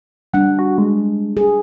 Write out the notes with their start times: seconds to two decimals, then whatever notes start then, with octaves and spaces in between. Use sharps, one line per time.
0.34 G3 D4 F#5
0.59 F#4
0.78 G#3
1.37 G#4